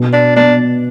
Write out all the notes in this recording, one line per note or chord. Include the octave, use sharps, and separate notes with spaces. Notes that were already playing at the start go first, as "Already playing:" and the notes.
Already playing: B2
D4
B3 D4